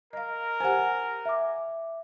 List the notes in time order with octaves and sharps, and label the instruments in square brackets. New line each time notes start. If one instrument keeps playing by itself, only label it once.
[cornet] A#4 [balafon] D#5 F5
[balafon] G4 C5 [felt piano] F#5 G#5
[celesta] E5 D6